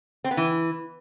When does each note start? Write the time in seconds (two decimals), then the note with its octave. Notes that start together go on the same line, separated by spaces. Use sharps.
0.24 C4
0.31 B3
0.37 E3